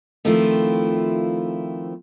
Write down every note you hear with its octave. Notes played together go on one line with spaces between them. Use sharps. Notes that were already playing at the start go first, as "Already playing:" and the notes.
D#3 F3 A3 C4 E4 F4